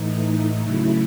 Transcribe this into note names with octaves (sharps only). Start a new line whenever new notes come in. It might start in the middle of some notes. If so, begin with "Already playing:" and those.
Already playing: A2 E3 A3 D#4
D#4
C#3 F#3 A3 E4